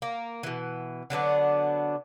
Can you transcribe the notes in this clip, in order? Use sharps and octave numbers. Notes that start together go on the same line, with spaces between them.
A#3
B2 E3
D3 F#3 B3 D4